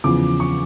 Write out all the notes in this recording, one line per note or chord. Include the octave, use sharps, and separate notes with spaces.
E2 C#3 F3 D6
C#6